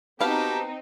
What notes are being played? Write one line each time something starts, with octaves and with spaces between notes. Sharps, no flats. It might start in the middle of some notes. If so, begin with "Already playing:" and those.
B3 C4 D#4 F#4 G4 F5 G5 A5